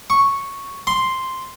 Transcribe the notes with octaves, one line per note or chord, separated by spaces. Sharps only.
C#6
C6